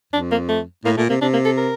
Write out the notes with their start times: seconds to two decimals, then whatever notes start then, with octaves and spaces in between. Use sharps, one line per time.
0.13 F2 D4
0.31 A#3
0.49 A3
0.85 A2 A#3
0.97 A#2 A3
1.09 C3 A#3
1.21 C3 D4
1.33 A#3
1.45 A4
1.57 A#4